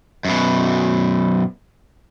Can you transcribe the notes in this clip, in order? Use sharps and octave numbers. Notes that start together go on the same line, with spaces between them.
F#2 B2